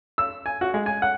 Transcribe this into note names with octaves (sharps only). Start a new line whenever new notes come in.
E6
G#5
F#4
G#3
G#5
F#5